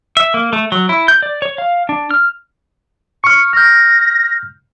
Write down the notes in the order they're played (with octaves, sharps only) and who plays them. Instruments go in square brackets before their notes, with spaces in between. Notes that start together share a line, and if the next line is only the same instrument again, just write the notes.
[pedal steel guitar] E5
A#3
A3
F#3
E4
G6
D5
C#5
F5
D4
F6
[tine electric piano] C#6 F6 [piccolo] C#7
[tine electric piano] F6 G6 [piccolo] A#6